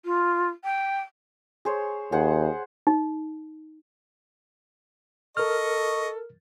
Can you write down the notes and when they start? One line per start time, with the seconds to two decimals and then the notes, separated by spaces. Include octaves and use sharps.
0.05 F4
0.64 G5
1.65 G#4 C5 C#5
2.12 D#2 G#4 C5 F#5
2.87 D#4
5.37 A4 A#4 D#5 C#6 F6